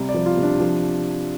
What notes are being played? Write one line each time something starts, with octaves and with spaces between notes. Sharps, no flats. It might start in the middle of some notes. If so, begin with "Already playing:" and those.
Already playing: C3 G3
D5
F3
F4
C3
D4
F3